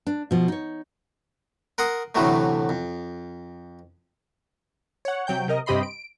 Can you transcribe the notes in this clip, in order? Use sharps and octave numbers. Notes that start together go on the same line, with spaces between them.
D4
B2 F3
D#4 C#5
A#4 F#5 C6 D#6
D2 A2 C3 E3 F#3 A3
F2
C#5 F#5
C3 F#3 G5 G6
C3 A#4 D#5
G2 C3 G4 D#5 B5 C6
D7